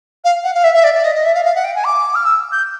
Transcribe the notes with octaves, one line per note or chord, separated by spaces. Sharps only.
F5
F#5
F5
E5
E5
D5
D5
D#5
D#5
E5
F5
F5
F#5
G5
G#5
D6
F6
E6
G6